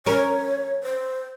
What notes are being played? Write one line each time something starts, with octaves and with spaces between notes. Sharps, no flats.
C#4 A#4 C#5
C5